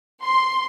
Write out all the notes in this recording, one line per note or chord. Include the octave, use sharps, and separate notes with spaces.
C6